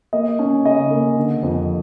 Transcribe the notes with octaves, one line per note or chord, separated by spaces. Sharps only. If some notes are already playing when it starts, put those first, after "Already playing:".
A#3 D#5
C#4
C#3 D#5
A#3
D3
F2